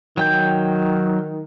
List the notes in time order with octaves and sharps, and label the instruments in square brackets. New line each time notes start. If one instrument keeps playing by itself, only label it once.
[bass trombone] D#3 [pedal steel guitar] F#3 G5 G6